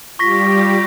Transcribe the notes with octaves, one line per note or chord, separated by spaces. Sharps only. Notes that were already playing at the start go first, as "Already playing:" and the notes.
G3 F4 G4 C#6 A#6 B6